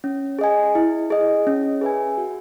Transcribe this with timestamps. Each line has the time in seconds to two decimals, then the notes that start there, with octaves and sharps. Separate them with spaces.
0.04 C#4
0.39 G#4 D#5 G#5
0.75 E4
1.10 G#4 D#5
1.47 C#4
1.81 G#4 B4 E5 G#5
2.17 F#4